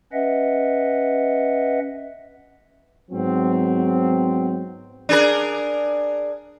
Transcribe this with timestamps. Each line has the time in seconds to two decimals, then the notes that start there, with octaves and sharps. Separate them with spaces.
0.13 C#4 B4 D#5 E5 F#5
3.11 G#2 F#3 B3 C4
5.09 D4 G#4 A#4